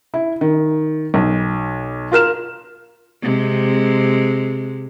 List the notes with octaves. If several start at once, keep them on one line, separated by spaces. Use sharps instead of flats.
E4
D#3
B1
F4 A#4 F6 E7
C3 G#3 C4